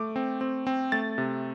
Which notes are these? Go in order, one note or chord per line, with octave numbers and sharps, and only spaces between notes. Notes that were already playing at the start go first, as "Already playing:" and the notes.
Already playing: A3 D6
C4
C4
C4
A3 A6
C3